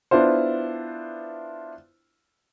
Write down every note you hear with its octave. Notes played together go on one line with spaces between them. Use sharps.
B3 D4 E4 F4 C5